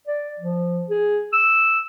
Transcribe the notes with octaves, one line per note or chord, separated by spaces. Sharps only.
D5
F3
G#4
E6